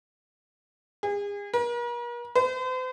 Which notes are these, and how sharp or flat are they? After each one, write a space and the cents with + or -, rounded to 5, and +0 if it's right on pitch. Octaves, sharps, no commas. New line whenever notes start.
G#4 -35
A#4 +45
C5 -40